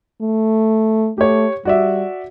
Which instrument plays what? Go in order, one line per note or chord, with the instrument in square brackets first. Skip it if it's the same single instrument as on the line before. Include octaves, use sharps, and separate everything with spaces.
[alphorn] A3
[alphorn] A3 [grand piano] G4 C#5
[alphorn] G3 [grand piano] F#4 D5 E5